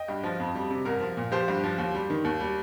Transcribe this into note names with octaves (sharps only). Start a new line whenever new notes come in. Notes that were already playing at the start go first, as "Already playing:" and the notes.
Already playing: D#5 G5
G2
F3
F2
G3
C3
C2 A#4
F3
A#2
F3 G4 C5
G2
F3
D#2
G3
D#3
D#2
G3